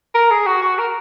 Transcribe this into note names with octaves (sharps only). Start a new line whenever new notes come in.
A#4
G#4
F#4
F#4
A#4